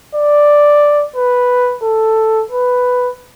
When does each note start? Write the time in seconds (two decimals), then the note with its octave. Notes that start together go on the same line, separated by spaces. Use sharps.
0.15 D5
1.16 B4
1.83 A4
2.51 B4